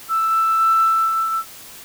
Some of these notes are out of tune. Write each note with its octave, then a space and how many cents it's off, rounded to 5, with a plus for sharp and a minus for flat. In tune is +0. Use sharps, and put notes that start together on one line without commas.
E6 +10